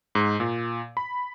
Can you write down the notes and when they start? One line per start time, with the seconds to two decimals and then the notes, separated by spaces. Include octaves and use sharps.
0.15 G#2
0.40 A#2
0.97 B5